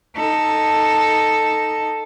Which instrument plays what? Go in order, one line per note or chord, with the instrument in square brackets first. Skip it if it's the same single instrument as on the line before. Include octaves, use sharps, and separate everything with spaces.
[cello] D#4 A4